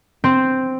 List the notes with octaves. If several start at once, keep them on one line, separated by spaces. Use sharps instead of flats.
C4